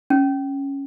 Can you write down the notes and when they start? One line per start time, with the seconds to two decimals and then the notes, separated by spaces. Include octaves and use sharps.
0.10 C#4